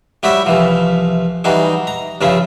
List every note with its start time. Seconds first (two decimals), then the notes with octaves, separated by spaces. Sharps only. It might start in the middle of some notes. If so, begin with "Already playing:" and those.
0.23 G3 E4 F#4 G4 C#5 E5
0.46 C2 E3 F3
1.44 E3 G3 D#4 F#4 G#4
1.87 A#5
2.21 G2 C#3 F3 C#4 E4